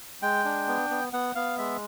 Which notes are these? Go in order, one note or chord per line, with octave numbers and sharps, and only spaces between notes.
G#3 G5
D4
B3
B3
B3 F#5
B3 F5
G#3 E5